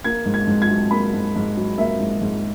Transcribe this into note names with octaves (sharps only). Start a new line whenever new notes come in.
A#3 G#6
G#2
G#6
G#2
G#6
F#3
A#3 B5
G#2
G#2
F#3
A#3 E5
G#2
G#2